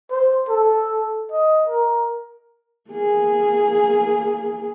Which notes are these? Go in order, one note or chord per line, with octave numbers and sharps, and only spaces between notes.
C5
A4
D#5
A#4
A#3 G#4